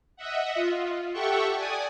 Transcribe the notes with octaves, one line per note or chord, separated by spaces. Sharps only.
D#5 E5 F#5
F4
G4 A4 E5 F#5 G5 C#6
D5 G#5 D#6